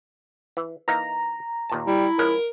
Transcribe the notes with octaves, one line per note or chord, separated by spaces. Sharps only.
E3
E3 A#3 D#4 A#5
D#2 A#2 A5
G3 E4
F3 G#3 C#4 A#4